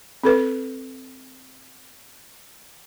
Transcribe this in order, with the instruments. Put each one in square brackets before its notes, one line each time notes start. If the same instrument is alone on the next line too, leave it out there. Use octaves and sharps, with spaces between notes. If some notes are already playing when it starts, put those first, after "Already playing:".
[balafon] C4 A4 B4